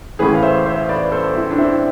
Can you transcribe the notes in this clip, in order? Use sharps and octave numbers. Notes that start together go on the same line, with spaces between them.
A1 A2 E3 G#4 B4
F5
C5 E5
C5 E5
B4 D5
A4 C5
C4 E4
D4
C4 E4